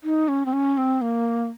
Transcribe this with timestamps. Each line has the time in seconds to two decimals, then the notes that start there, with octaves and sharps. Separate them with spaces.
0.04 D#4
0.28 C#4
0.46 C4
0.53 C#4
0.78 C4
1.01 A#3